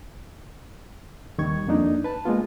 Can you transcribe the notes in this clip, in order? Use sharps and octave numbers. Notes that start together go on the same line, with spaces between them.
D#2 D#3 G3 C#6 G#6
F2 A#3 D4 D#4
B4 A5
G#3 A#3 B3 F4